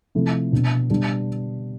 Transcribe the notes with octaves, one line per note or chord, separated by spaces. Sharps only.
C3 F3 A3 C4 E4
B2 B3 D4
B2 G3 B3 D4